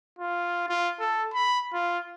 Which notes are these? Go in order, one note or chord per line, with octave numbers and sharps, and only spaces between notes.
F4
F4
A4
B5
F4